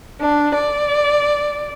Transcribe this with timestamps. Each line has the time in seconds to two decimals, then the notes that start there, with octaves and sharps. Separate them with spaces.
0.19 D4
0.54 D5